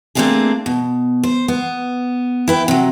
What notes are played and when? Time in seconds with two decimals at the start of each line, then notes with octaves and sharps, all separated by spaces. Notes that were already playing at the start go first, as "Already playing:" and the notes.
0.15 A3 A#3 C4 D4 F4 G#4
0.66 B2
1.23 C5
1.48 B3
2.48 E4 B4 G5
2.68 C3 F#3